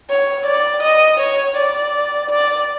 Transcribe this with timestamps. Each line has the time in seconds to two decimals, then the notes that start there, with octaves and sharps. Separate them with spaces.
0.10 C#5
0.47 D5
0.83 D#5
1.20 C#5
1.57 D5
2.30 D5